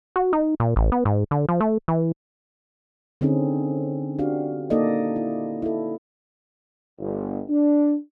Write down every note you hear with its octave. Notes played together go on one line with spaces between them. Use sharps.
F#4
D#4
A#2
A1
B3
G#2
D3
F3
A3
E3
D3 C4 C#4 D#4 G#4
D4 F#4 G4 F5
A#3 D#4 A4 D5 D#5
E4
E4 A4
G1
D4